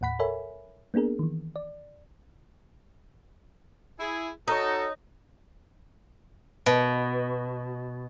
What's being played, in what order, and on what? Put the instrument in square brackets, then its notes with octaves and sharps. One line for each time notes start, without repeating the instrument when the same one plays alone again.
[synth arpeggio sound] D#2 A2 F#5 B5 B6
A4 A#4 C#5 E5 G#5 B5
A#3 B3 D4 G#4 A#4
D#3 E3
D5
[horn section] E4 G#4
[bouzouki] D#4 [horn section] F#4 A4 [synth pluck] C#5 D#6
[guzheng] B2